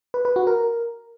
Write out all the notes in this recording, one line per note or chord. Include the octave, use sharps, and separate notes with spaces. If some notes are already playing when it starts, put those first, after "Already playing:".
B4
B4
F#4
A#4